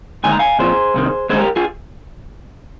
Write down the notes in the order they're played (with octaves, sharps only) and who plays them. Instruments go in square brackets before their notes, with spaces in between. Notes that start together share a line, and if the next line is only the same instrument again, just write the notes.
[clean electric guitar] D#2 D3 G#3 D#4 G#5
A#5
F5 G#5
A#2 F3 C4 F4 G#4 C5
C2 C3 D#3
D#2 D3 G#3 D#4 G#4 C5
G4 A#4
F4 G#4